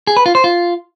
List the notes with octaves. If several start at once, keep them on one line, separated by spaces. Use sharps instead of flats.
G#4
B4
F4
C5
F4